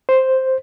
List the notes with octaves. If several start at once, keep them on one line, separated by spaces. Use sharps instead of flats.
C5